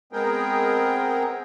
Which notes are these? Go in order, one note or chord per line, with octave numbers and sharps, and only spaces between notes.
G#3 B3 C4 G#4 A#4 G5